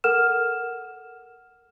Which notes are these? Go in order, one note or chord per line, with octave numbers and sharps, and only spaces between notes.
A4 A#4 F#5 F6 E7